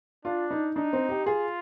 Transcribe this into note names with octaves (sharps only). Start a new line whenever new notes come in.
D4 F4
D#4
D4 D#4
C4
G4
F4 G#4